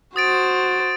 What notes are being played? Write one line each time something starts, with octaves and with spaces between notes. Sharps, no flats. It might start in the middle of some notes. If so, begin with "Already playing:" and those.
F#4 C5 D#6 A6 D7